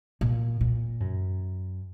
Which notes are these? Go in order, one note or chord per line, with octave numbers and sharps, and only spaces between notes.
A#2
A#2
F#2